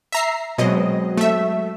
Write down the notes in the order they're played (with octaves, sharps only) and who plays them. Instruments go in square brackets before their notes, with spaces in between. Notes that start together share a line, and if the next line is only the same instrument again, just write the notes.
[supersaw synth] E5 A#5 C7
[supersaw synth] B2 D#5 [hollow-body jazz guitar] F#3 G#3 C4
[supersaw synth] A3 E5